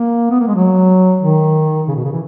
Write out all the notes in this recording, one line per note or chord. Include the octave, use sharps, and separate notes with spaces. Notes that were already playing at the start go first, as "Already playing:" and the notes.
Already playing: A#3
B3
A#3
G#3
F#3
D#3
C#3
B2
C#3
E3